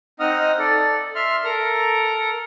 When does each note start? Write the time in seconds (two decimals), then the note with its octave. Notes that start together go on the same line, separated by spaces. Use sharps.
0.20 C4 D#4 D#5 F#5 D#6 F6
0.59 A4 D5
1.15 E5 C6 F6
1.44 A4 A#4 A#5